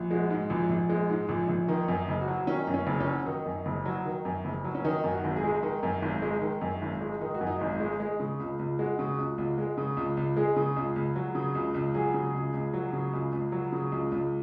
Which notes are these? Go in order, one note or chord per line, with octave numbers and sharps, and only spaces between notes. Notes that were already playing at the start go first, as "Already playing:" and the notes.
Already playing: A#1
G#3 F#4
G#2
A#1
A#1
G#3
G#2
A#1
A#1
D#3 D#4
F#2
D#4
F#1
F#4
F#3
D#3 C#4
F#2
C#4
F#1
C#4
F#3
D#3 D#4
F#2
F#1
F#3
D#3
F#2
F#1
F#3
C#4
D#3 D#4
F#2
F#4
G#1
G#4
G#3
D#3
F#2
G#1
G#3
D#3
F#2
G#1
G#3
D#3 D#4
F#4
F#2
D#4
G#1
G#3
G#3
C#3
C#2
C#2
G#3 F#4
C#3
C#2
C#2
G#3
C#3
C#2
C#2
G#3 G#4
C#3
C#2
C#2
F#3
C#3
C#2
C#2
F#3 G#4
C#3
C#2
C#2
F#3
C#3
C#2
C#2
F#3
C#3
C#2
C#2